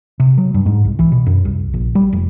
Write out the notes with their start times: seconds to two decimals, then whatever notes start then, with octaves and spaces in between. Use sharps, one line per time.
0.20 C3
0.38 F#3
0.54 G2
0.66 G#2
0.85 C2
0.99 E3
1.12 B2
1.26 F#2
1.45 C2
1.74 A#1
1.95 G3
2.13 F1